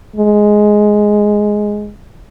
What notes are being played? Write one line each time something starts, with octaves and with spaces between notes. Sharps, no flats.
G#3